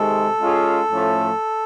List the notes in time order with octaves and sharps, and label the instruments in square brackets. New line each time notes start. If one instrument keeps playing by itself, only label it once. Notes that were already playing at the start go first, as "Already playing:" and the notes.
Already playing: [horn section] C3 D#3 G#3 [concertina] A4
[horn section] G#3 C#4 F4 G#4
A2 F3 A3 C#4